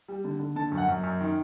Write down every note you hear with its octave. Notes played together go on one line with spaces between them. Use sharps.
G3
D3
D3
D3 A5
F#2
F#5
F#2
F#2
D#3